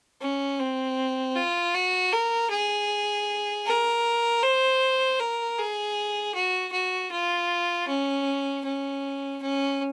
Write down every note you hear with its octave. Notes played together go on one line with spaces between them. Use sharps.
C#4
C4
F4
F#4
A#4
G#4
A#4
C5
A#4
G#4
F#4
F#4
F4
C#4
C#4
C#4